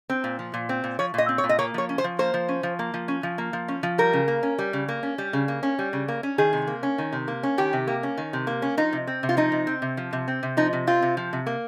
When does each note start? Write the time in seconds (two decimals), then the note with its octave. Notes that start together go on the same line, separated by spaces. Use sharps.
0.10 C4
0.24 A#2
0.39 F3
0.54 A#2
0.69 C4
0.84 A#2
0.99 F3 C#5
1.14 A#2 D#5
1.29 C4
1.38 C#5
1.44 A#2
1.49 D#5
1.59 A#3 C#5
1.74 F3 C#5
1.89 C#4
1.98 C5
2.04 F3
2.19 A#3 C5
2.34 F3
2.49 C#4
2.63 F3
2.79 A#3
2.94 F3
3.08 C#4
3.23 F3
3.38 A#3
3.53 F3
3.68 C#4
3.83 F3
3.98 G3 A#4
4.13 C#3
4.28 A#3
4.43 C#4
4.58 G3
4.73 C#3
4.88 A#3
5.03 C#4
5.18 G3
5.33 C#3
5.48 A#3
5.63 C#4
5.79 G3
5.93 C#3
6.08 A#3
6.23 C#4
6.38 D#3 G#4
6.53 C3
6.67 A#3
6.83 C#4
6.98 D#3
7.13 C3
7.28 A#3
7.43 C#4
7.58 D#3 G4
7.73 C3
7.87 A#3
8.03 C#4
8.18 D#3
8.33 C3
8.47 A#3
8.62 C#4
8.77 F3 D#4
8.93 C3
9.07 C4
9.23 C3
9.29 F4
9.37 F3 D#4
9.52 C3
9.67 C4
9.82 C3
9.97 F3
10.13 C3
10.28 C4
10.43 C3
10.57 F3 D#4
10.73 C3
10.87 C4 F4
11.02 C3
11.17 F3
11.33 C3
11.47 A#3